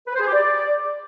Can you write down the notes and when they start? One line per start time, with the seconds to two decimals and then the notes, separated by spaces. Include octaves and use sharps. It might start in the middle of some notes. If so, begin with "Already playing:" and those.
0.07 B4
0.14 C5
0.20 G#4
0.27 G4
0.33 D5